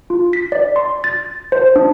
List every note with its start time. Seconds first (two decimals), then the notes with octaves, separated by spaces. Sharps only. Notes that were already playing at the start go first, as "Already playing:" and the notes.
0.10 F4
0.33 B6
0.52 D5
0.76 C6
1.04 A6
1.52 C5
1.76 D4